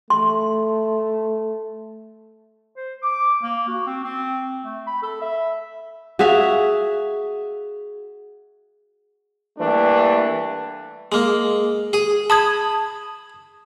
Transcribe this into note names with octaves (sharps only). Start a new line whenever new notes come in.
A3 C6
C5
D6
A#3
F#4
C4
C4
A3
B5
A4
E5
F#4 G#4 E5 F5
E3 G3 A3 A#3 D4
G#3 A#3
G#4 D#6
A5 B5 D#6 G#6